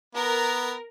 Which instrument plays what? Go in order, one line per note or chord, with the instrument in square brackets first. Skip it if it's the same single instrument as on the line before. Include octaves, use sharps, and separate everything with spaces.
[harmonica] B3 [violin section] A#4